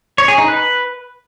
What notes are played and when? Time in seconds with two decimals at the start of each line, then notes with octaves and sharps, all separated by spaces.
0.18 C#5
0.28 G#4
0.38 D#4
0.48 B4